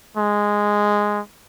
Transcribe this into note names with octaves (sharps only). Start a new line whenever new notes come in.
G#3